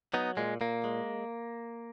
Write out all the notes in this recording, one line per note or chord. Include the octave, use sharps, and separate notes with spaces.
F#3 B3 D#4
A#2 G#3
A#2 A#3
G#3